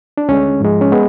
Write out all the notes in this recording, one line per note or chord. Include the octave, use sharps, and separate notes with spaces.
D4
D2 D3 G#3 C#4
G#2 F3 G#3
C#4
G#3 B3